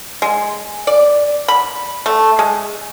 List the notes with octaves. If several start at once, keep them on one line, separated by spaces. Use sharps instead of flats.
G#3
D5
B5
A3
G#3